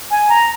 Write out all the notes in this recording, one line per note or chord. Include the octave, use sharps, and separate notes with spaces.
G#5
A#5